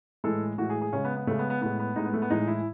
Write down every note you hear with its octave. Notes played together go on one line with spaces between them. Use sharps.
A2 E3 G#3 A4
A2 E3 G#3 F#4
G#4
G#4
C#3 G#3 C#4
B3
B3
C#3 G#3 A3
B3
B3
A2 G#3 B3
B3
A2 G#3 D#4
B3
A3
B3
A2 E3 G#3 D#4
E4